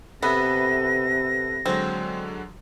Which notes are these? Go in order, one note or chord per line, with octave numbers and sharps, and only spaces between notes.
C3 B3 A4 B4 E5 A#6
D3 F#3 G#3 C4